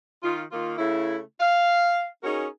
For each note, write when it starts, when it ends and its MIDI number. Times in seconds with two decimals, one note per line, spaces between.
0.23 0.41 51
0.23 0.41 63
0.23 0.41 65
0.52 0.73 51
0.52 0.73 58
0.52 0.73 65
0.78 1.19 49
0.78 1.19 57
0.78 1.19 64
1.40 2.04 77
2.23 2.47 61
2.23 2.47 63
2.23 2.47 66
2.23 2.47 68
2.23 2.47 70